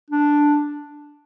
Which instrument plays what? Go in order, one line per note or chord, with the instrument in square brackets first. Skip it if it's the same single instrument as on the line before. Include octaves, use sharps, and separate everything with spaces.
[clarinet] D4